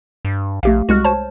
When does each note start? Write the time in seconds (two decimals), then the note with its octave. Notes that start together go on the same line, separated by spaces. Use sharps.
0.25 G2
0.63 A#1 A3 G4 F5
0.89 C2 G#3 F#4 F6
1.05 C5 C#5 A5